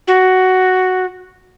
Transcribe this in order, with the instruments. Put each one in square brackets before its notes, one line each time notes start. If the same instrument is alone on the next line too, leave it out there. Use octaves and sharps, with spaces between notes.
[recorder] F#4